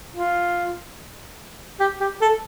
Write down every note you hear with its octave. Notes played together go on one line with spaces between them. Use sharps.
F4
G4
G4
A4